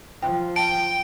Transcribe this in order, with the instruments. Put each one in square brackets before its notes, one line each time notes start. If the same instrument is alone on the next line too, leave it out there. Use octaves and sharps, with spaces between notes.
[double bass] F3 [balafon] G5
[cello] G5 [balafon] A5 [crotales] D7